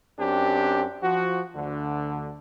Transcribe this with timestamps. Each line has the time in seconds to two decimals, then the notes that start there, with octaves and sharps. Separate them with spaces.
0.19 F#2 C4 D4 G4
1.02 F3 F#4
1.55 D2 D3